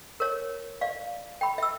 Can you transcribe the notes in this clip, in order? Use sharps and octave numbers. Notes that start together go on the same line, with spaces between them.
A#4 C#5
D5 F5
G5 B5
E5 E6